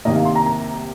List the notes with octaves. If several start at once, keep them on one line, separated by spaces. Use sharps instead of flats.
C2 C3 D#3 A#3 D#5
F5
C6
A#5
A#5